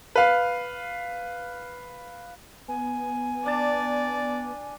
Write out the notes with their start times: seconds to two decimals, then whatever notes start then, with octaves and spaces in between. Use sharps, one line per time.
0.16 B4 F5
2.68 B3 G#5
3.46 D4 D5 A5